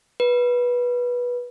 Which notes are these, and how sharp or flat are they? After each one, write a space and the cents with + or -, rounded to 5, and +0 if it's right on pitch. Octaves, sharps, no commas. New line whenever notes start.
B4 -15